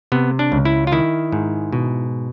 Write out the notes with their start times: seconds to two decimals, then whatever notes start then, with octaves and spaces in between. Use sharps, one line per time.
0.12 C3 B3
0.39 D4
0.52 C#2
0.65 E4
0.87 F4
0.92 D#3 E4
1.32 G#2
1.73 B2